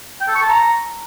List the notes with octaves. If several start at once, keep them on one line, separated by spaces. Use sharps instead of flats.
G5
A4
C#6
A5
A#5